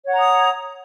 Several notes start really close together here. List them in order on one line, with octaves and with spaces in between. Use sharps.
C#5 F#5 A#5 D#6